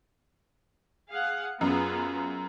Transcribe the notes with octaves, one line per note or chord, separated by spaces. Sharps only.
G#4 F5 F#5
F#2 B3 F4 G#4